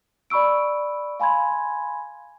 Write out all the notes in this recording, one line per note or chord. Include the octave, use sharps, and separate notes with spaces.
D5 B5 C#6 E6 D7
F5 G#5 B5 C6 G#6